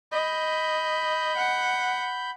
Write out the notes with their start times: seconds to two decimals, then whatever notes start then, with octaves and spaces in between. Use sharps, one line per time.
0.12 D#5 B5 G6
1.37 F#5